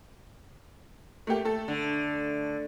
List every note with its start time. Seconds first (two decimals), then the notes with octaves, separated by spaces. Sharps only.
1.27 A3 A#3 G4
1.45 A3 A4
1.68 D3